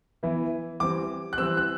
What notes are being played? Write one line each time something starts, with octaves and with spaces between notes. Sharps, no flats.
E3 B3 E4
E3 G3 C4 D6
F#6
E3 G3 C4 E6
F#6